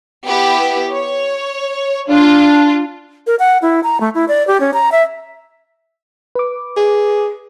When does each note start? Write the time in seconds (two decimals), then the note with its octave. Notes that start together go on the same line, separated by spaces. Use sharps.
0.25 B3 E4 G4
0.91 C#5
2.09 D4 F4
3.27 A#4
3.39 F#5
3.62 E4
3.83 A#5
4.01 A3
4.15 E4
4.28 D5
4.47 G4
4.60 C#4
4.74 A#5
4.92 E5
6.35 B4 D6
6.77 G#4